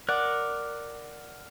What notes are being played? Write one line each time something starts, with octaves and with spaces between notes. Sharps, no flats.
A#4 D5 F#5 D6 F#6